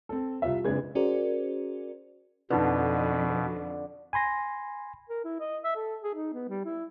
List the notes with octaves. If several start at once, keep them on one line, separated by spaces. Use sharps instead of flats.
C4 A4
C2 F4 E5
F#1 G#3 C4 D4 B4 G#6
C#4 F#4 G#4 A#4 C5 D5
F2 B2 D3 D#4 B4
G#5 B5 C6 A#6
A#4
E4
D#5
E5
A4
G#4
D#4
B3
G3
E4